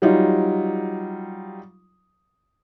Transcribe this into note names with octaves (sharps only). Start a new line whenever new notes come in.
F#3 G3 D#4 F4